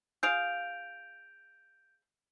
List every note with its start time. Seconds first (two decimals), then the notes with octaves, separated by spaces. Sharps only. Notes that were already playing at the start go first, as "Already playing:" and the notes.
0.23 F4 G#4 F5 G6 D7 F7